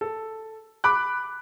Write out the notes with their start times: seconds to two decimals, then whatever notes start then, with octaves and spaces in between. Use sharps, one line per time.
0.01 A4
0.84 B5 D6 F#6